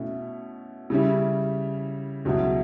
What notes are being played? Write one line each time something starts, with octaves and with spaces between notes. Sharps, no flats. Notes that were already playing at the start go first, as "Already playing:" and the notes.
Already playing: B2 A3 C#4 E4
C#3 G3 C#4 E4
C#2 B2 F#3 C#4 E4